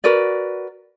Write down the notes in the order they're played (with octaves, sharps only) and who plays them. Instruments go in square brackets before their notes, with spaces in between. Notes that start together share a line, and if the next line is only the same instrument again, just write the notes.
[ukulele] F#4 A#4 B4 D5